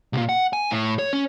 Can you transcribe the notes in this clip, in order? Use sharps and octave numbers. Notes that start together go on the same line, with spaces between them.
C2 A#2
F#5
G#5
A2
C#5
C#4